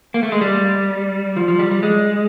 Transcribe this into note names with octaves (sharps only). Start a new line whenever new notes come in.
A#3
A3
G#3
G3
F3
F3
G3
G3
G#3